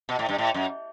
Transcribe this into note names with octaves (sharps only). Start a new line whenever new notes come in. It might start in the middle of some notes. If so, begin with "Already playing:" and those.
B2
A2
G2
A2
F#2